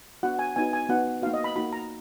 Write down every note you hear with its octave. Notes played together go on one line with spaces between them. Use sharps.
B3 D4 F#4 F#5
G#5
B3 D#4 F#4 G#5
G#5
B3 D#4 F#4 F#5
A#3 D#4 F#4 F5
D#5
B5
A#3 D#4 F#4 B5
A#5